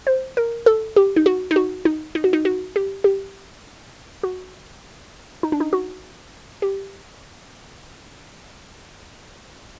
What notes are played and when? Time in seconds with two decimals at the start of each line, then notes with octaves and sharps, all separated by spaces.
0.07 C5
0.37 A#4
0.66 A4
0.96 G4
1.16 D#4
1.26 F#4
1.51 D#4
1.56 F#4
1.85 D#4
2.15 D#4
2.24 F#4
2.33 D#4
2.45 F#4
2.76 G4
3.04 G4
4.23 F#4
5.43 D#4
5.52 D4
5.60 D#4
5.73 F#4
6.62 G4